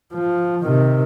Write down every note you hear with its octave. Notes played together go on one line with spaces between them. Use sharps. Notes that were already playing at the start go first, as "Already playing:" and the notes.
F3
C3 D#3